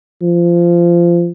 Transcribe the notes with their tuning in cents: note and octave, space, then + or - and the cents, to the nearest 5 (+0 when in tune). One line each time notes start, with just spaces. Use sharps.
F3 -20